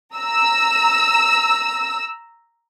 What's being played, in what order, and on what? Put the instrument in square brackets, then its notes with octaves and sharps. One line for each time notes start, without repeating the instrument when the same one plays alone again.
[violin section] A#5 E6